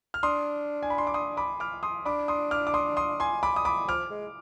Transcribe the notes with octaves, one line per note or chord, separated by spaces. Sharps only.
F6
D4 C6 D#6
G#5
B5
C6
D6
C6 D#6
B5 D6
D6 F6
C6 D#6
D4 B5 D6
C6 D#6
D6 F6
D6
C6 D#6
C6 D#6
G#5 C6
B5 D6
D#6
B5 D6
F3 D6 F6
G#3